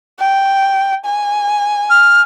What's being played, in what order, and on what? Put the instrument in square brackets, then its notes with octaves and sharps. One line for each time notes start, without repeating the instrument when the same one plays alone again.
[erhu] G5
G#5
[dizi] F6